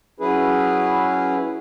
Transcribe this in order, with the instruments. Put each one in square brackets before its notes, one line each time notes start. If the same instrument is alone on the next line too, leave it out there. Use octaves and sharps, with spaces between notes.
[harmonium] F#3 C#4 E4 G#4 B4